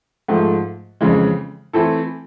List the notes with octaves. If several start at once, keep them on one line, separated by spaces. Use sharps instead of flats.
G#2 F3 A3
F2 C#3 E3 G#3
E3 A3 C4 E4 A4